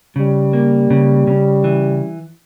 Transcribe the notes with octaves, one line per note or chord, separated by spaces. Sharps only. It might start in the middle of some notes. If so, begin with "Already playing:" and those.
C#3 G3
A#3
C#3
C#3
E3